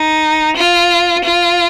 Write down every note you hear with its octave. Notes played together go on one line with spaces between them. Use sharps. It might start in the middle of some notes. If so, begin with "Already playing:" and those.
Already playing: D#4
F4
F4